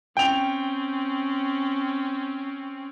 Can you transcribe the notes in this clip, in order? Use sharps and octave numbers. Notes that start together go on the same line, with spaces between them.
C4 C#4 G5 F7